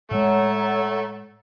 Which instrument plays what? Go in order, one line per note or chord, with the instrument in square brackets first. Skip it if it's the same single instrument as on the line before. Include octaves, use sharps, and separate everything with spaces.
[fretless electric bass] A2 G#3 [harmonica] A3 E5 [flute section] C#5 F#5 A#5